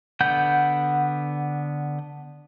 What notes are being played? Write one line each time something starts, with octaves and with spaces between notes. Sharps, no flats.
D3 B3 F#5 G6